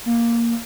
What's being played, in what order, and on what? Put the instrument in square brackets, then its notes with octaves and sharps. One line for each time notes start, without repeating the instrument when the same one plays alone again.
[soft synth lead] A#3